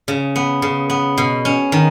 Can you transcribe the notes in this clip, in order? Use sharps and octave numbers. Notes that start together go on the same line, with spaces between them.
C#3
B3
C#3
B3
B2
C#4
D#3